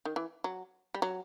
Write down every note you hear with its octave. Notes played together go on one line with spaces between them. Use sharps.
D#3
E3
F#3
G3
F#3